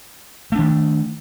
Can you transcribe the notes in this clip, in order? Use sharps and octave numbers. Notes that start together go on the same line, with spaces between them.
D#3 A3 D4